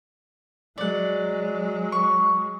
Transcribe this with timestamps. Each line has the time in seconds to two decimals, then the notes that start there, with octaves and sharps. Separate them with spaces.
0.78 F#3 G#3 D5 F#5
1.92 C#6